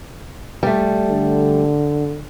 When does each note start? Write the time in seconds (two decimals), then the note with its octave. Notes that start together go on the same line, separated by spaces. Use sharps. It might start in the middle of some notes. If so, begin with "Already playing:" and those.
0.63 G3 A3
1.10 D3